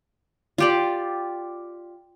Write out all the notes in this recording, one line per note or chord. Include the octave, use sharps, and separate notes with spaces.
F4 G4 D5